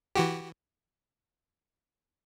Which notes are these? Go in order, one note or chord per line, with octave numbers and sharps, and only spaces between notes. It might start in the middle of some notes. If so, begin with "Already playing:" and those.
E3 F#4 G4